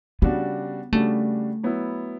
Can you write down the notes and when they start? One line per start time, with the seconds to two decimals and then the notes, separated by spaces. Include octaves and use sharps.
0.22 C#3 G3 B3 D4 F#4
0.93 C#3 G3 A3 D4 F#4
1.63 F#3 B3 E4